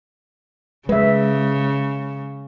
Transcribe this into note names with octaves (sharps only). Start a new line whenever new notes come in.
C#3 G#3 B4 E5